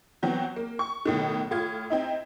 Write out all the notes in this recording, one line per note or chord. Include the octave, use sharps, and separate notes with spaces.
E3 F#3 B3 C4
A#3
C#6
B1 A2 D#3
A2 F4 G#6
C4 D#4 E4